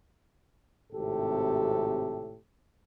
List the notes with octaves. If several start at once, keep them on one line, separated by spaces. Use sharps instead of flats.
G#1 A2 C3 G4 A4